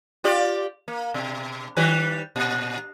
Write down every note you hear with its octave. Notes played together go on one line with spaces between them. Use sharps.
F4 G4 D5
A#3
B2
D#3 G3 B4
A#2